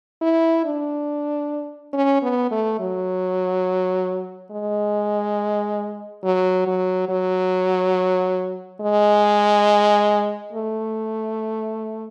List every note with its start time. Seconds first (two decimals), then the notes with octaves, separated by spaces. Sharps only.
0.22 E4
0.65 D4
1.93 C#4
2.23 B3
2.51 A3
2.80 F#3
4.51 G#3
6.24 F#3
6.67 F#3
7.09 F#3
8.81 G#3
10.53 A3